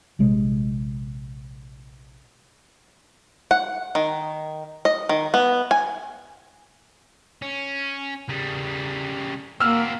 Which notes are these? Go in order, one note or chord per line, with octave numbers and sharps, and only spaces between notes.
A#1 C3 G#3
F#5
D#3
D#5
D#3
B3
G#5
C#4
C#3 G3
A#3 C4 F#4 E6 F6